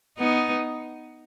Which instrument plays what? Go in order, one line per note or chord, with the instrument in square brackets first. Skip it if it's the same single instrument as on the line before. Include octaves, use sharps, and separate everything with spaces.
[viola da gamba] B3 D#4